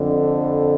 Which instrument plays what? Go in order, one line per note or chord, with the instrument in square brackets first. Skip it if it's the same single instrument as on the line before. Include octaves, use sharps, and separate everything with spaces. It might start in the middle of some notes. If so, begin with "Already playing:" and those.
Already playing: [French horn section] F2 D3